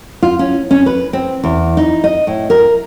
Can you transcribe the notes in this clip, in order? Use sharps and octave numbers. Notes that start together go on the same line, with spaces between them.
F4
C#4
C#4
B4
C4
E2
D#4
D#5
A2
A#4